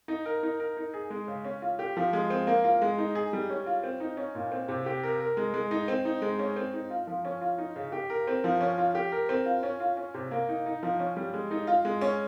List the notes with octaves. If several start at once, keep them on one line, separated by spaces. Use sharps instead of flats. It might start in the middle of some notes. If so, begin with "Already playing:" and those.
D#4
A#4
D#4
A#4
D#4
G#4
G#3
C#3
C#4
F4
G4
F3
G#3
C4
A#3
F4
G#3
D#4
G#4
G3
C#4
F4
C4
D#4
C#4
A#2
C4
C3
G4
A#4
A#4
G#3
G#3
D#4
C4
D#4
G#3
C#4
C4
D#4
F4
F3
C#4
F4
D#4
C#3
G4
A#4
C4
F3
C#4
F4
G4
A#4
C4
F4
C#4
F4
C#4
C3
A#3
D#4
D#4
F3
C#4
G3
G#3
D#4
F4
G#3
C#4